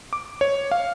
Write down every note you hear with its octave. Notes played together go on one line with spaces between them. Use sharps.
D6
C#5
F5